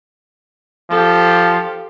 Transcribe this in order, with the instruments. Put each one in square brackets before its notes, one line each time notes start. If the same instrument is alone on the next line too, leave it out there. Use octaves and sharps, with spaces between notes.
[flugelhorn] F3 [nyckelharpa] G4 A4